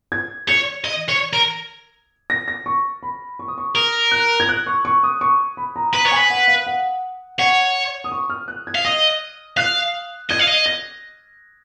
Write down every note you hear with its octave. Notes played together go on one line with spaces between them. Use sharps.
G#6
C#5 G#6
D#5
C#5
A#4
A#6
A#6
C#6
B5
C#6
D#6
C#6
A#4 D#6
F#6
G#6
F#6
C#6
C#6
D#6
C#6
B5
A#5
B4 A#5
C#5
B4 G#5
F#5
F5
F#5
C#5 F#5
D#6
C#6
F6
F#6
G#6
F5
D#5 D#6
F5 F#6
D#5 G#6
F5
D#5
A#6